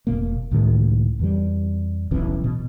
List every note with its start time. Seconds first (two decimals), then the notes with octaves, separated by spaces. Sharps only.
0.07 F1 B2 A#3
0.51 C#2 A2 D#3 A#3
1.19 F2 E3 G3
2.11 D#1 B1 E3 C#4
2.44 B2